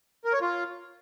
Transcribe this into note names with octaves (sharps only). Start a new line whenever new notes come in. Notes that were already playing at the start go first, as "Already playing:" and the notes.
A#4
C#5
F4